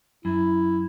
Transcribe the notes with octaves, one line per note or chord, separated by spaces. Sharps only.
F#2 E4